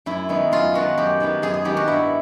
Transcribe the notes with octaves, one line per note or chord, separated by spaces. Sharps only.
F#2 E4
D#3 G#3 B3
F#2 F4
D#3 G#3 B3 F#4
F#2 G4
D#3 G#3 B3
F#2 G#4
G#4
D#3 G#3 B3 G4
F#4
G2 E4